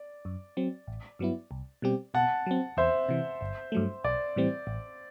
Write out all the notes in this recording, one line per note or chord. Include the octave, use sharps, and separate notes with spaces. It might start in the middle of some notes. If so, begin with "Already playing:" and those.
Already playing: D5
F#2
F#3 C4
A1
G2 F#3 B3 E4
C2
B2 G3 C4 G4
B2 F#5 A5
F#3 C4
E2 C5 E5
C3 E3
G1
G2 F#3 A3
B1 D5
A2 E3 G3 C4
A1